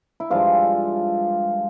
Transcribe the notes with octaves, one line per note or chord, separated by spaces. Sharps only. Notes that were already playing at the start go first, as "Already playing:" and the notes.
E4
G2 F3 G#3 F4